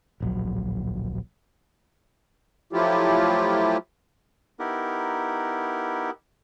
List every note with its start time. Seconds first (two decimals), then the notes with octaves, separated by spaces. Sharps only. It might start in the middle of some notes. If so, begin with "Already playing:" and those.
0.20 D1 A#1 F#3
2.73 F3 F#3 A3 E4 F4 G4
4.59 B3 D#4 E4 G4 A#4